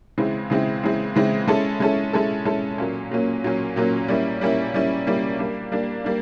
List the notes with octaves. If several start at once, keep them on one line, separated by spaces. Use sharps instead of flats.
C#3 E3 G#3 C4 E4
C#3 E3 G#3 C4 E4
C#3 E3 G#3 C4 E4
C#3 E3 G#3 C4 E4
G#3 C#4 E4 A4
G#3 C#4 E4 A4
G#3 C#4 E4 A4
G#3 C#4 E4 A4
A#2 F#3 A#3 C#4
A#2 F#3 A#3 C#4
A#2 F#3 A#3 C#4
A#2 F#3 A#3 C#4
G3 A#3 C#4 E4
G3 A#3 C#4 E4
G3 A#3 C#4 E4
G3 A#3 C#4 E4
G3 A#3 D4
G3 A#3 D4
G3 A#3 D4